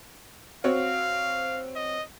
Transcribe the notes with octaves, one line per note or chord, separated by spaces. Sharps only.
C4 F#4 C#5 F5
D#5